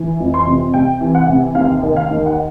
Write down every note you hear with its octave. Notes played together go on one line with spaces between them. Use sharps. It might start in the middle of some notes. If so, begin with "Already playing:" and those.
Already playing: E3
F2
C6
C3
C3 G5
E3
F#5
C3
D#2 F5
D#3
F5
D#2
F#5